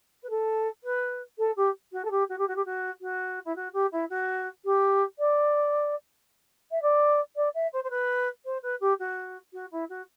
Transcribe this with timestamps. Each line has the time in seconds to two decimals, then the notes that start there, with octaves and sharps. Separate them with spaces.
0.23 B4
0.29 A4
0.83 B4
1.38 A4
1.56 G4
1.92 F#4
2.04 A4
2.10 G4
2.29 F#4
2.38 G4
2.47 F#4
2.55 G4
2.65 F#4
3.01 F#4
3.45 E4
3.55 F#4
3.73 G4
3.92 E4
4.09 F#4
4.64 G4
5.18 D5
6.71 E5
6.82 D5
7.36 D5
7.54 E5
7.72 C5
7.83 C5
7.90 B4
8.44 C5
8.62 B4
8.80 G4
8.99 F#4
9.53 F#4
9.71 E4
9.89 F#4